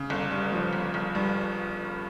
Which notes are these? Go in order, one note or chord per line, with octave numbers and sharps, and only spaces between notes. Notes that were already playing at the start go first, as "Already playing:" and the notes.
Already playing: C#3
G1
G2
F3
G1
G1
G2